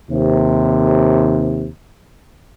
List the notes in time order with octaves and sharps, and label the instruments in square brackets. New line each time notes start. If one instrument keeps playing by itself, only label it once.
[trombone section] D#2 C3